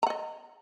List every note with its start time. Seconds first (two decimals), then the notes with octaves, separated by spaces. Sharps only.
0.03 A#5
0.07 F#5
0.10 D#5